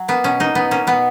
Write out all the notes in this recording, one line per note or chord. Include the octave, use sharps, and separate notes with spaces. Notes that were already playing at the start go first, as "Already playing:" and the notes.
Already playing: F#3
A#3 B3
B2 C#4
A#3 D#4
B2 B3
A#3 C#4
B2 B3